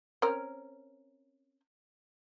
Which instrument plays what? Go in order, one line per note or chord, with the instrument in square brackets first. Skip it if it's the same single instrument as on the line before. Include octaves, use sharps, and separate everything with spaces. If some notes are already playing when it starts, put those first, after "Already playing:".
[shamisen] C4 C#4 A#4